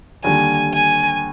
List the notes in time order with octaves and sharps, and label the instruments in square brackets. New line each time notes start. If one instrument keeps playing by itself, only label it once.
[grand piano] D#2 D3 G3 [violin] G#5
[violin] G#5